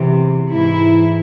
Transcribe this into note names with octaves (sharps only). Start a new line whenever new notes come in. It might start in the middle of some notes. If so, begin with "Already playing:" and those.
Already playing: E2 C3 E3
G#2 E3 E4